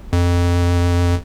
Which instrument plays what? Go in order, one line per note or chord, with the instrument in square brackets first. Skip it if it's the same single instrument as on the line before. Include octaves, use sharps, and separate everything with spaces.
[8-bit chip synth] F2